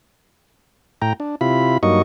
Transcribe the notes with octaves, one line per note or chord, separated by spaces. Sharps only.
A2 G5 A#5
D4
C3 E4 F4 B5
G2 F#3 A#3 D#4 D#5 C#6